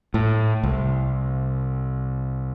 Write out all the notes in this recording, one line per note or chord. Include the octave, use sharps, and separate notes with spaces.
A2
C2